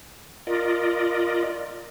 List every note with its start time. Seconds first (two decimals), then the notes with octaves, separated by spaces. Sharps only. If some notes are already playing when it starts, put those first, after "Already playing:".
0.47 F4 A#4 D5 D#5